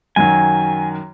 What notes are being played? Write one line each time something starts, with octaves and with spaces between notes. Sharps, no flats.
F#2 D#3 F#3 G#5